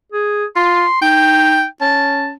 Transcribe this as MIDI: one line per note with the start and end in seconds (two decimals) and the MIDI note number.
0.12 0.45 68
0.56 0.85 65
0.56 0.98 84
1.02 1.64 63
1.02 1.65 79
1.81 2.35 61
1.81 2.30 81